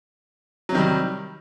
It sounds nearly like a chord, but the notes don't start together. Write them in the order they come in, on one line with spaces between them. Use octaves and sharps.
F#3 C3 D#3 G3